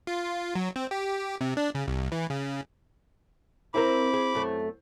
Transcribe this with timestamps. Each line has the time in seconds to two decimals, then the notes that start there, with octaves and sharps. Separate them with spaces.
0.07 F4
0.55 F#3
0.76 C4
0.91 G4
1.41 C3
1.57 D4
1.75 C#3
1.88 C2
2.12 E3
2.30 C#3
3.74 C4 E4 A#4 C5 B5 D6
4.14 G#4
4.35 F#2 A3